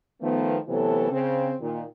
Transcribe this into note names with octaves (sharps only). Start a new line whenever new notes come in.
D#3 F3 A3 B3
C3 E3 F#3 A3 B3 A4
C#3 C4
A#2 D#3